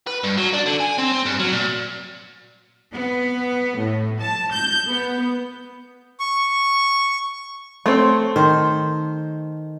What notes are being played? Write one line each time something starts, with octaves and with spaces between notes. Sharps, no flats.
B4
G2
F#3
D4
D3
G#5
C4
C4
G2
F#3
A#2
B3
A2
A5
G6
B3
C#6
A3 C4 C5 C#5 C6
D#3 C5